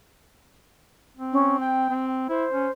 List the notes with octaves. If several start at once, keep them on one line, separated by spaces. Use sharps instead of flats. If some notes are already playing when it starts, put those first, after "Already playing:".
C4
C#4
G5
C4
E4 C5
C#4